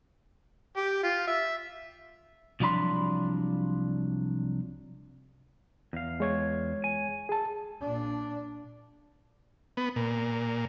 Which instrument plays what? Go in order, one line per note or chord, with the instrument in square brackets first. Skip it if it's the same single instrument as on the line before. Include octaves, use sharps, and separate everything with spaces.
[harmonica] G4
F4
E5
[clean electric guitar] C2 F3 F#3 D4 B5 C6
[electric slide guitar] E2 F5
[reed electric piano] G#3 C#5 G#6
[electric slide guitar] G#5
[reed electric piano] G#4 A5
[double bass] A#2 D4
[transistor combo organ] B3
A#2